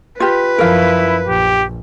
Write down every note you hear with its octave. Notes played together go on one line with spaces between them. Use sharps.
F4 G4 B4
F#2 F3 E4 A#4 F5
A#1 G4